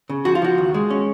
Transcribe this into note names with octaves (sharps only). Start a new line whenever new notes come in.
C#3
F3 F#4
F4
F3 F#4
D#2
G#3
C#4